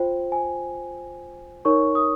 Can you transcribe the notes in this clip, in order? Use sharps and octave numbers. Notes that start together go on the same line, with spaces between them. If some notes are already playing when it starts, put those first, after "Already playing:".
Already playing: F4 C5 G5
G#5
D#4 A#4 C#5 C#6
D#6